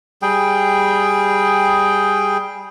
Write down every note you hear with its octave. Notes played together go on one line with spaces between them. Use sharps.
G3 G#4 G5